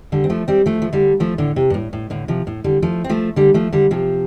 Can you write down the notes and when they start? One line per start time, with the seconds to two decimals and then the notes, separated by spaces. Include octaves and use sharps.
0.12 D3 G3
0.24 C4
0.30 F3 A3
0.48 G3 C4
0.66 F3 A3
0.82 F3
0.93 D3 G3
1.20 F3 A3
1.38 A2 D3
1.56 C3
1.70 G2
1.74 A2
1.93 A2
2.10 A2 D3
2.28 C3 F3
2.47 A2
2.64 D3 G3
2.82 F3 A3
3.04 C4
3.09 F3 A3
3.36 D3 G3
3.54 F3 A3
3.73 D3 G3
3.91 C3 F3